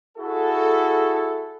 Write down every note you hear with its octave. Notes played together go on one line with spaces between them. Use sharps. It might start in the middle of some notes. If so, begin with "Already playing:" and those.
E4 F#4 G#4 A4